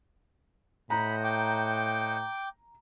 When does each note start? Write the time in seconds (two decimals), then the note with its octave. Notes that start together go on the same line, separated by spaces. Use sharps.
0.90 A2 C5 D#5 F#5 A#5 B5
1.24 G5 D6